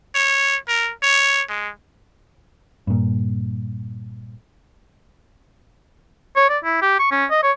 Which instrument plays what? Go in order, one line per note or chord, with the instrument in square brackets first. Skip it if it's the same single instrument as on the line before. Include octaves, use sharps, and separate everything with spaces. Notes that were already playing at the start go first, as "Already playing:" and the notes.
[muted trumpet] C#5
A#4
C#5
G#3
[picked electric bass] G2 A#2
[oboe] C#5
D5
E4
G4
C#6
C#4
D#5
C#5